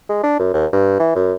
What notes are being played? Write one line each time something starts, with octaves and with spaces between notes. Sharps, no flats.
G#3
D4
F#2
D#2
G2
E3
F#2